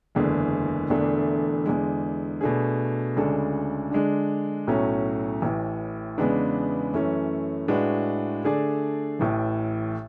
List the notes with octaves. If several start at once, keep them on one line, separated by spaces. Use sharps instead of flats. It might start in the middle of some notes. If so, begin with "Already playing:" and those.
F#1 E2 D3 G#3
E1 E2 D3 A3 D4
E2 D3 G#3
B2 A3 D4 G#4
D2 C#3 G#3 D4 A4
D3 G#3 D4
B1 A2 F#3 A3 C#4
A1 A2 E3
E2 C#3 G#3 B3 D4
F#2 E3 A3 C#4
A2 G#3 D4 F#4 B4
D3 A3 D4 G#4 D5
A1 A2 E3